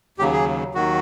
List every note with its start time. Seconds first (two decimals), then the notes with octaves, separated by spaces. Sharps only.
0.18 D#2 C#3 F#3 G4
0.32 G#4
0.75 D#2 D#3 F#3 F#4